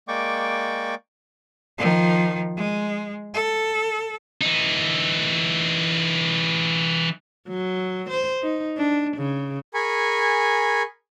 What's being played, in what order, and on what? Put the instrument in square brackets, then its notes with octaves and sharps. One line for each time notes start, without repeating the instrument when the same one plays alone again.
[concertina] G#3 A#3 D5 G5 C#6 D6
[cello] D#3 F3
G#3
A4
[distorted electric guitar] E3 D#4
[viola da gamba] F#3
C5
D#4
D4
C#3
[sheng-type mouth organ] G#4 A#4 G#5 B5 C#6